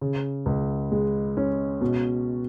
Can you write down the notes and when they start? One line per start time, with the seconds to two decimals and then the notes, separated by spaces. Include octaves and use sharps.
0.01 C#3
0.46 C#2
0.92 G#3
1.37 C#4
1.81 B2